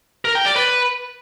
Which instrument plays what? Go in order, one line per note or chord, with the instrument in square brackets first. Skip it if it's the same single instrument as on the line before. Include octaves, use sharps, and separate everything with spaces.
[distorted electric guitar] A#4
G5
D5
B4